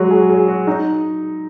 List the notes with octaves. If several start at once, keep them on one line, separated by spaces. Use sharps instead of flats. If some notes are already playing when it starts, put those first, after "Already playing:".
Already playing: F#3 G#3 F#4
G#4
G#4
F#4
D#4